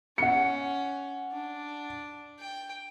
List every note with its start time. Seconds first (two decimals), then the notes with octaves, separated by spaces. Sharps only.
0.18 C#4 F#5 C#7
1.32 D4
2.39 G5